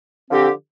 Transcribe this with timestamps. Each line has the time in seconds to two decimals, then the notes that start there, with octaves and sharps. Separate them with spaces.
0.30 D3 F3 C4 G4